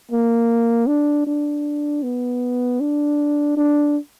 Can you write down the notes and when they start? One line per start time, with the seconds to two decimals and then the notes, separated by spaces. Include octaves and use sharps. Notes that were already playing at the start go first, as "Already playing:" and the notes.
0.11 A#3
0.87 D4
1.26 D4
2.03 B3
2.80 D4
3.57 D4